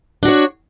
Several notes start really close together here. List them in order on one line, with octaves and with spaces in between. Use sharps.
D4 F#4 C#5